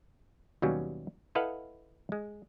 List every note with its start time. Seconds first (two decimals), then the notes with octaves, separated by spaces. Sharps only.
0.62 D#2 B2 F#3 G3 C#4
1.35 E4 A4 B4 D#5 F5 F#5
2.12 G#3